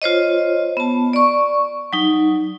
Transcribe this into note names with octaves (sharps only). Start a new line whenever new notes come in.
F4 C5 C#5 D#5
B3 A5
D5 C#6
F#3 D#4